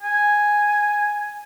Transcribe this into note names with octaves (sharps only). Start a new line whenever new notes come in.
G#5